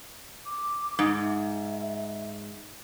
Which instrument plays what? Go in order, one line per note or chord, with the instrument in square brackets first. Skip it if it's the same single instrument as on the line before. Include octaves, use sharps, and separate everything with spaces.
[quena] D6
[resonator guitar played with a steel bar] G#2
[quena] E5